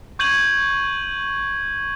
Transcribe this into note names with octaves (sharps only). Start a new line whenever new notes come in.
C#6 G6 G#6 D#7 F#7